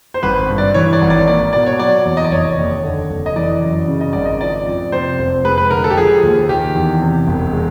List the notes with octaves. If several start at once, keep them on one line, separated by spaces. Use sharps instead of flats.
C5
G#1 B4
G2
D5
E3 C#5
D5
G#1
D5
A#3 D5
B2 D5
C#5
F#3 D5
E2
D#5
D5
F1 C#5
D#2
D3
F1
D#5
E3 D5
F#2
C#3
D#5
G#1 D5
D#5
F3 D5
F2
C3 C5
F1
G#3 B4
B4
D3 A#4
A4
G4
F3 G#4
D#2
D#3 G4
E2
C3
E1
G#3